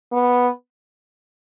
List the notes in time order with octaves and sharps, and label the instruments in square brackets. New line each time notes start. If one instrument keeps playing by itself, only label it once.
[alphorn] B3